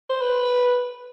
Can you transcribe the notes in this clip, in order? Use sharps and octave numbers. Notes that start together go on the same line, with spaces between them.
C5
B4